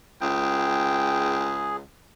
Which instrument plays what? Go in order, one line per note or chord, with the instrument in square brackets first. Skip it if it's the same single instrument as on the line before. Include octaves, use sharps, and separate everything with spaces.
[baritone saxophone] C#2 [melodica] G#4 [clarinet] G5